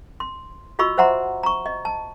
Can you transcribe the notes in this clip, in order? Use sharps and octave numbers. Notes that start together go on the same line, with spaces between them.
C6
F4 F#4 D#5 B5 C#6 E6
C5 E5 F#5 A#5 C6
A#5 C#6
D#5
A5